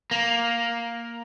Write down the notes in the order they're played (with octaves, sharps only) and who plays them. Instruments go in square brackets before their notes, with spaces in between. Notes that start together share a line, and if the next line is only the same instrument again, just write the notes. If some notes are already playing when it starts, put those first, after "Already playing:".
[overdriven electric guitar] A#3